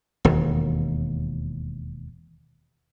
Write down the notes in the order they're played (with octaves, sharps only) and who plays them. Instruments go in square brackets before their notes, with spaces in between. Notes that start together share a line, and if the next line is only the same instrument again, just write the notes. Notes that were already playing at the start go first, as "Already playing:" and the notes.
[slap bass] E1 D#2